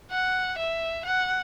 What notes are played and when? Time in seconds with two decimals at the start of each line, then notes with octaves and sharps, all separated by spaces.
0.11 F#5
0.58 E5
1.05 F#5